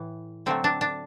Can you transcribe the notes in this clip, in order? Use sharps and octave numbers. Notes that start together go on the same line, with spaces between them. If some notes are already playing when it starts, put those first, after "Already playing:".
Already playing: A2 E3
D3 F#3 A3 C4
D4
D4